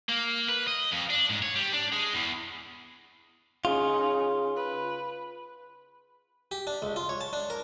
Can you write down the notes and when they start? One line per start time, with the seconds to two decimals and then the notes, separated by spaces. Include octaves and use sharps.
0.09 A#3
0.49 B4
0.68 D#5
0.92 F2
1.10 D4
1.30 G#2
1.43 C#5
1.55 G3
1.74 D4
1.93 G#3
2.14 E2
3.65 C#3 C#4 D#4 F4
4.56 B4
6.51 G4
6.67 D4
6.82 C#2
6.96 F4
7.09 C#5
7.21 A5
7.33 D4
7.50 A#4